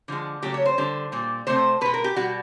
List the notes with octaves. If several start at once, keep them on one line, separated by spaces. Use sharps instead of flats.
D3 F3 G#3
C#3 F#3 A3 G4
C#5
C5
D3 G3
A#2 G3
C3 E3 A3 C5
B2 G#3 B4
A#4
G4
B2 G3 F#4